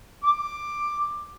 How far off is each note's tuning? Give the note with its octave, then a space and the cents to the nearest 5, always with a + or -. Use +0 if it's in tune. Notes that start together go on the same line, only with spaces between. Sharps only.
D6 +10